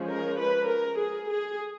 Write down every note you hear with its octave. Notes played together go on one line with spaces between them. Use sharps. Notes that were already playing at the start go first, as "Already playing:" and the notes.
Already playing: F3 G#3 C#4
A#4
B4
A#4
G#4
G#4